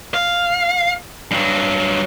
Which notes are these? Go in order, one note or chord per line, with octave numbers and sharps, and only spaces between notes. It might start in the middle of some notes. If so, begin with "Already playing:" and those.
F5
G2 F#3